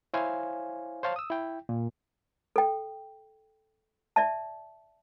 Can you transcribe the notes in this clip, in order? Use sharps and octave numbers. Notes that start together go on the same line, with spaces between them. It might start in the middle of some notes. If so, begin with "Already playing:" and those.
E4 C5 C#5 F5 G#5
C5 C#5 F5 A5
D#6 E6
E4 G5
A#2
A4 G5
D5 E5 A5